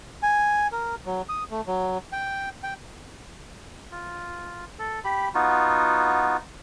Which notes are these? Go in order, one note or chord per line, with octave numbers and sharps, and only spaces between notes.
G#5
A#4
F#3
D#6
A3
F#3
G5
G5
F4
A4
G4 B5
B3 D#4 F4 F#4